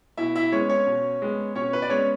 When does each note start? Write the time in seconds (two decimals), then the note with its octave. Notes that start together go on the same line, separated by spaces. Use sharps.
0.17 B2 E4 E5
0.36 E4 E5
0.52 G#3 B3 C#4 C#5
0.69 C#4 C#5
0.87 B2
1.22 G#3 B3
1.55 B2 C#4 C#5
1.73 B4
1.82 D5
1.90 G#3 B3 C#4 C#5